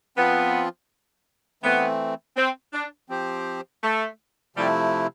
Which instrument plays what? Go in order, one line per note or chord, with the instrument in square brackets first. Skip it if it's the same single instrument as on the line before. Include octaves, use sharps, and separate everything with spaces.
[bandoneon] F3 C4 F4 [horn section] B3
[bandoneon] E3 A3 C4 [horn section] B3
[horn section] C4
D4
[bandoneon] F3 C4 G4 C5
[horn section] A3
[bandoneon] C3 F3 A3 E4 [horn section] G3